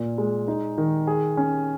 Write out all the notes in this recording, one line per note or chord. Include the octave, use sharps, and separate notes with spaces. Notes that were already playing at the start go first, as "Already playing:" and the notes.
Already playing: A#2 A#3
G#3
D#4
D#3
G#4
C#4